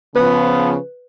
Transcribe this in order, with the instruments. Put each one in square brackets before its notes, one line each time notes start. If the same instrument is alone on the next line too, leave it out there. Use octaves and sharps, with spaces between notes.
[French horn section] C#3 F3 [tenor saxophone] B3 [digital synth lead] B4